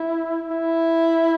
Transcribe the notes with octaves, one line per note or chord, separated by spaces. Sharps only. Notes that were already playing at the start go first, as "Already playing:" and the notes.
Already playing: E4
E4